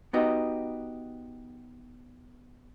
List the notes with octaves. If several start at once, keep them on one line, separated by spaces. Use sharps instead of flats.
B3 D#4 F#4 G4 B4 D#5